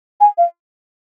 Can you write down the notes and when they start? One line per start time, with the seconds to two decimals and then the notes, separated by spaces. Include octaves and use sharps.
0.21 G#5
0.38 F5